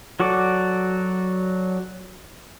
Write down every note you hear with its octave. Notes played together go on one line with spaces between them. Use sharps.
F#3 F#4 A4 D5